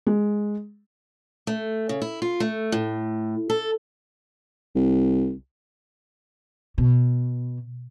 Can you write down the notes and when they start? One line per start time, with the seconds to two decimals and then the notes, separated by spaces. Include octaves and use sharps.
0.07 G#3
1.47 A3
1.89 C#3
2.02 E4
2.22 F4
2.40 A3
2.72 A2
3.50 A4
4.75 C2
6.78 B2